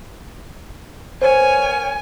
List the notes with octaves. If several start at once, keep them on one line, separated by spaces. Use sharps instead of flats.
B3 A#4 C5 C#5 G#5